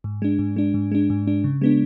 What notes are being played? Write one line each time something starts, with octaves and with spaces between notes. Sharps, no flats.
G#2
G#3 D4
G#2
G#3 D4
G#2
G#3 D4
G#2
G#3 D4
C#3
G#3 B3 D4